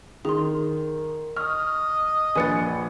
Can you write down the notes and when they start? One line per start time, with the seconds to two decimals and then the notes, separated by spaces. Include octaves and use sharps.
0.25 D#3 G#4 C6
1.36 D#5 C#6 F6
2.35 A#1 B4 G#5 F#6 A6 C#7